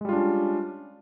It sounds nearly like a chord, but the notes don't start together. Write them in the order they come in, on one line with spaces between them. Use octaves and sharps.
G#3 G3 F4 D4 C#4